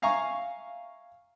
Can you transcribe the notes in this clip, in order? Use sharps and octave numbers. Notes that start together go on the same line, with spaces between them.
E5 F5 G#5 A#5 C#6